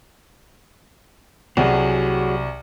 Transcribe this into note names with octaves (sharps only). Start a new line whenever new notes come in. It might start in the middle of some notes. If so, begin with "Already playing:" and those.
C2 F#3 F#4 G#4